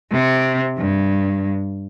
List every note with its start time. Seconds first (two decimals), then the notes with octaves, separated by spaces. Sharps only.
0.11 C3
0.78 G2